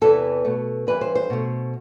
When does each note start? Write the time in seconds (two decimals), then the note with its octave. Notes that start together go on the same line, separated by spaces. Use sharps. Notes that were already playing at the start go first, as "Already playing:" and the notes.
0.01 E2 C3 E3 A4
0.45 B2 A3
0.87 G2 E3 G3 B4
1.01 C5
1.15 C5
1.30 B2 A3